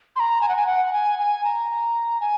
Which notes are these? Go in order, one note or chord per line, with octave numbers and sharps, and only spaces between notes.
C6
A#5
G#5
F#5
G#5
F#5
G#5
G#5
A#5
G#5